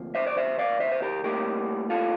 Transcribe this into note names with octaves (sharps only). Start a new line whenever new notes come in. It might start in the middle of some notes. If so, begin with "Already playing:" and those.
Already playing: D2 C3 F3 A#3
C5 E5
D5
C5 E5
D5 F5
C5 E5
C5
G4 A#4
A2 G3 A#3 G4 A#4
F4 A4